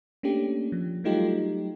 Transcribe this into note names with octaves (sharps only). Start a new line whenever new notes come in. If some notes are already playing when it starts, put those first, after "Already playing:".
A3 A#3 C#4 D4 G4
F3
F#3 G3 A3 D#4 F4 G4